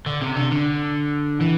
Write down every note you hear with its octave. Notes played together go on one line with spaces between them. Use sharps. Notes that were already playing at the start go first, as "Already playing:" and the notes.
D3
C3
D3
D3
E3